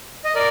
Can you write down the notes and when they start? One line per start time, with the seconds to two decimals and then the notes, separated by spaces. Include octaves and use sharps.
0.25 D#5
0.35 A#4 D5